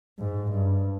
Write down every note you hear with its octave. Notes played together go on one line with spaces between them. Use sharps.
G#2
G2